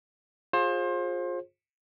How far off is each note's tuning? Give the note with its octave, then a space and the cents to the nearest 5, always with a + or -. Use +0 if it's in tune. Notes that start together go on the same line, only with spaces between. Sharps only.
F4 +25 G#4 +0 C5 +30